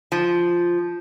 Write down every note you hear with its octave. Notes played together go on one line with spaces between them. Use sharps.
F3